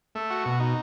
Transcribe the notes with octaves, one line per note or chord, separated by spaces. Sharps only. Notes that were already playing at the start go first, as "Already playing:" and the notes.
A3
F#4
B2
D#4